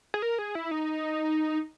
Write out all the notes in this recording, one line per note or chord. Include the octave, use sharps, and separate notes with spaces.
G#4
A#4
G#4
E4
D#4